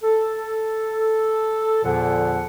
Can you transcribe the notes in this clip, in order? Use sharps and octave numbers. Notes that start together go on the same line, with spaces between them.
A4
E2 A#2 D3 F3 F#5